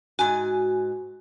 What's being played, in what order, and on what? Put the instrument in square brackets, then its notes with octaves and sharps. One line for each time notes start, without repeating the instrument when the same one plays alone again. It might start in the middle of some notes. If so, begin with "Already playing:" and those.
[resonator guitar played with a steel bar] G#2 G#5 [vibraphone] F#4